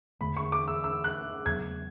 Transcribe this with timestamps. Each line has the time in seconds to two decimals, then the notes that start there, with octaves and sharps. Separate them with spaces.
0.21 E2 D3 A3 B5
0.37 C#6
0.52 D6
0.68 E6
0.84 E6
1.04 F#6
1.46 E2 C#3 F#3 B3 G#6